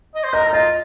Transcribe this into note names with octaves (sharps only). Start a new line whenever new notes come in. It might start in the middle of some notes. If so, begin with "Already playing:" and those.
D#5
C5
A#4 D#5
D#4
F4 D#5